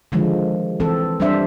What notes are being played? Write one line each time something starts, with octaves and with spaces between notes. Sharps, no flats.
D3 D#3 F3 G#3
E3 C4 A4
G3 C4 D4 C5 E5